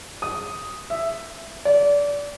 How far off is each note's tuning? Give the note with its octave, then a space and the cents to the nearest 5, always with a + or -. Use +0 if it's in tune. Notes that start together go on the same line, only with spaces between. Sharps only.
D#6 +5
E5 +10
D5 -25